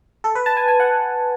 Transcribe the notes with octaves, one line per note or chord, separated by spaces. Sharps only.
A4
B4
A5
G#5
G#5
F#5